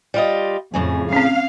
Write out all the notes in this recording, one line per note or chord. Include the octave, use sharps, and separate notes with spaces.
G3 F4 D#5
F2 A2 C#3 G#4
C4 C#4 F5